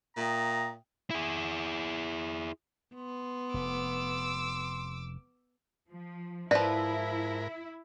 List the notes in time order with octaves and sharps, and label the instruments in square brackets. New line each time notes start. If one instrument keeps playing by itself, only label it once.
[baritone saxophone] A#2 [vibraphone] E5 G5 D#6 [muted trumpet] A#5
[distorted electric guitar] E4 G#4
[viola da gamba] B3 [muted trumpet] C6
[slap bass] F1 [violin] D6 E6
[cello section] F3
[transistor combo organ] G#2 A#4 [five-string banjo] F3 B4 [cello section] E4 [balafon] D5